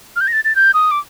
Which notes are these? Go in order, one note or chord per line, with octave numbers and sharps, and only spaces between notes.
F6
G6
A#6
A6
A6
G6
D#6
D6